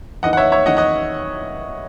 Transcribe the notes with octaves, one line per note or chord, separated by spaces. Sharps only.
E2 D#3 D#5 F#5
F#5
C#5 E5
C#5 E5
E2 D#3 D#5 F#5
D#5 F#5